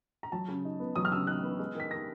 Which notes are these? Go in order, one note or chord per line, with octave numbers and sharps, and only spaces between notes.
A#5
F#3 A5
C#3
D#4
B3
F#3 D#6
F6
C#3 E6
D#4 F#6
B3
G#3
D#3 B6
D#3 A#6